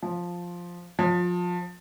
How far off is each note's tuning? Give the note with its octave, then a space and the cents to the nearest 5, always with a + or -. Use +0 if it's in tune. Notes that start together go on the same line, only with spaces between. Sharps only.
F3 +5
F3 +25